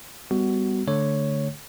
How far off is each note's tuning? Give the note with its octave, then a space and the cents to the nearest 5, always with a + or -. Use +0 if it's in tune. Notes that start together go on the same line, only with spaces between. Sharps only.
G3 +15 B3 +20 F#4 +10
D3 +0 A3 +0 C#5 +0